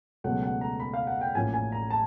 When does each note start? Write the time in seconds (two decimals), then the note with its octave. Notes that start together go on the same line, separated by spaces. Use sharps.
0.24 C#2 B2 F#3 A3 F#5
0.43 F#5
0.61 A#5
0.80 B5
0.94 F5
1.07 F#5
1.21 G5
1.35 A1 A2 F3 A#3 C#4 G#5
1.54 G#5
1.72 A#5
1.90 A5